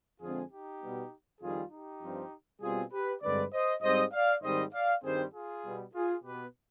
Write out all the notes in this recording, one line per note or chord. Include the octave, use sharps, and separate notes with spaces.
F2 D3 F3 G#3 C4 F4 G#4
D#4 G4
B2 G3 B3
F2 D#3 G3 F4 G#4
D#4 G4
G2 F3 C4
B2 G3 C4 F4 G#4
G4 B4
G2 D3 G#3 C4 B4 D5
C5 D#5
G#2 G3 C4 C5 D#5
D5 F5
G#2 D#3 G3 C4 C5 D#5
D5 F5
G2 D#3 G3 C4 G#4 C5
F4 G#4
B2 G3 B3
F4 G#4
B2 B3 G4 B4